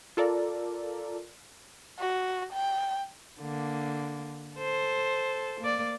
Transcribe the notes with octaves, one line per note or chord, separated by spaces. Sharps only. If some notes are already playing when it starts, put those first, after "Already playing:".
F4 A4 A#4 D5
F#4
G5
D3 A#3
A4 C5
A#3 D5